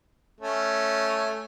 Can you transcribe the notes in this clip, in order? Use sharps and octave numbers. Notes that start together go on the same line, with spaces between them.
A3 C#4